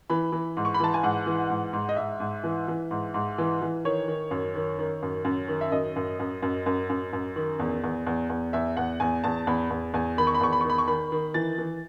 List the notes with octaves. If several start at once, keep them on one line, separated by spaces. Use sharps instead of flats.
E3 B5
E3
G#2
C#6
B5
E3 A5
G#5
G#2 F#5
E3
G#2
G#2
D#5
G#2 E5
G#2
E3
E3
G#2
G#2
E3
E3
D#3 C#5
D#3
F#2
D#3
D#3
F#2
F#2
D#3
E5
F#2 D#5
F#2
F#2
F#2
F#2
F#2
F#2
D#3
E2
E2
E2
E2
E2 E5
E2 F#5
E2 G#5
E2 A5
E2 B5
E2
E2 G#5
D#3 B5
C#6
B5
E2 C#6
B5
C#6
D#3 B5
C#6
D#3 B5
D#3
E3 A6
E3